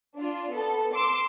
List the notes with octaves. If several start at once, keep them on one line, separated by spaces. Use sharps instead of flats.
D4 F4
B3 A4
C6 D6 E6